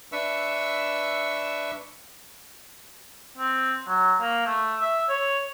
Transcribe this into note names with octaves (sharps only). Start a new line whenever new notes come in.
D4 B4 E5 C#6 E6
C4
F#3
A#3
A3
E5
C#5